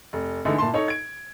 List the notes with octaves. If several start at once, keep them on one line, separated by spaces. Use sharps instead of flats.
F1
D3 E3 G#3 A3 D#4 E4
A#2 E4 A5 C6
D#4 A4 C#5
G#6 D7